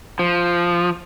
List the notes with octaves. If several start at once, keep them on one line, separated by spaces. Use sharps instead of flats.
F3